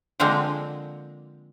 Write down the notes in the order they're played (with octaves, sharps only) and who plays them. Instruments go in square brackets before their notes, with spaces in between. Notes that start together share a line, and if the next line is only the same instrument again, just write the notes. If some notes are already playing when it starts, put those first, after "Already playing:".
[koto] D3 F3 G#3 A#3 C4